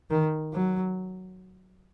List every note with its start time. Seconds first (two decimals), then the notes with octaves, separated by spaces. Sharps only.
0.10 D#3
0.53 F#3